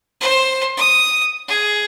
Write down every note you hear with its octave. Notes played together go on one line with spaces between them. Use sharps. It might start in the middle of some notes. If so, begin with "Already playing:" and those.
C5
D#6
G#4